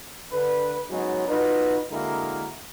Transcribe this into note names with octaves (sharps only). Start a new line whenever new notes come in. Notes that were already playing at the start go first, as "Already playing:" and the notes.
D3 B4
F#3 G#3 B3 C#4 D#4 F#4
D#4 F4 F#4 B4
D3 G#3 A#3 E4 F#4 A#4